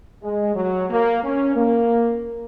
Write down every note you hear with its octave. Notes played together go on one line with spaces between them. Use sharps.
G#3
F#3
A#3
C#4
A#3